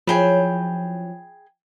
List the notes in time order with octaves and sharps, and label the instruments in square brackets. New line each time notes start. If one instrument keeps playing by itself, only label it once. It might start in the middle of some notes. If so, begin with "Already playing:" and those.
[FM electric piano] F3 [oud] F#3 C#4 E4 [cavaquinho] G#4 G5 B5